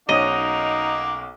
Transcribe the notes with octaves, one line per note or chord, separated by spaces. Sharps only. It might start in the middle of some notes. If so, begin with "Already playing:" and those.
B1 A#3 C#4 D#4 F#4 D#5 D6 D#6